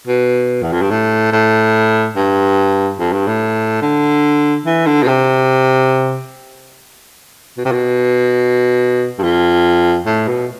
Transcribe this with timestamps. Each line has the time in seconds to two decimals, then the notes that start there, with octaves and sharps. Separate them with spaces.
0.07 B2
0.62 E2
0.72 F2
0.81 G2
0.91 A2
1.32 A2
2.16 G2
2.99 F2
3.12 G2
3.27 A2
3.82 D3
4.66 E3
4.86 D3
5.03 B2
5.08 C3
7.57 B2
7.65 C3
7.72 B2
9.18 G2
9.23 F2
10.06 A2
10.28 B2